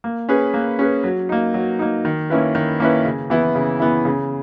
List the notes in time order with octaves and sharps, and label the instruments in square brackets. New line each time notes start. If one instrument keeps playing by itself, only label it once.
[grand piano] A#3
C#4 G#4 B4
A#3
C#4 G#4 B4
F#3
A#3 D#4
F#3
A#3 D#4
D#3
A#3 C#4 E4 B4
D#3
A#3 C#4 E4 B4
C#3
E3 B3 E4
C#3
E3 B3 E4
C#3